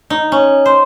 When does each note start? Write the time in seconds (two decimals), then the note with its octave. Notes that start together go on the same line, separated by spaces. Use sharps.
0.10 D#4
0.32 C#4
0.66 C5